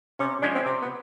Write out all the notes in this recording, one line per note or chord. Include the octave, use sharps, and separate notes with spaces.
C3 C#4
F3 G#3 C#4 D4
C4
C3 C4
B3